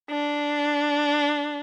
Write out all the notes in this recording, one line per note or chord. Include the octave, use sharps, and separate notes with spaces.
D4